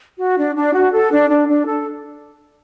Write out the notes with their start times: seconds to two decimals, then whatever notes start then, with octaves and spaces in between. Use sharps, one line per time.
0.18 F#4
0.37 D4
0.56 D4
0.74 F#4
0.92 A4
1.11 D4
1.29 D4
1.48 D4
1.66 A4